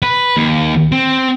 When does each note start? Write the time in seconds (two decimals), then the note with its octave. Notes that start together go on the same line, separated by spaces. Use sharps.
0.02 B4
0.37 D#2
0.92 C4